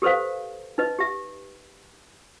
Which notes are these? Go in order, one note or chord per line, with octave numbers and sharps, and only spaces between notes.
G4 A4 B4 C5 F5
D#4 B4 D#5
G4 E5